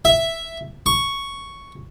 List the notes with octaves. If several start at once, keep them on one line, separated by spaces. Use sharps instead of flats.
E5
C#6